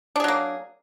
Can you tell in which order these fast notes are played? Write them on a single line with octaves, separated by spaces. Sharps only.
D4 G#4 F#3 A#3